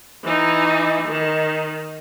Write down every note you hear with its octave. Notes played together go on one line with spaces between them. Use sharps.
E3 D#4
D#3